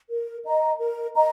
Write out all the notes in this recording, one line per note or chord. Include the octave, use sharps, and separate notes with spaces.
A#4
D#5 A#5
A#4
D#5 A#5